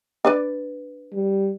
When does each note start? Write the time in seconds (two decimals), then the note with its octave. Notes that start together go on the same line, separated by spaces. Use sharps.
0.25 D4 B4 D5
1.13 G3